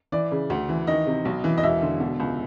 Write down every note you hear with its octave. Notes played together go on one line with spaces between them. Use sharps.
E3 D5
C#3
D2
E3
D#3 D#5
C3
B1
E3
D#5
E1 E5
D3
B2
C#2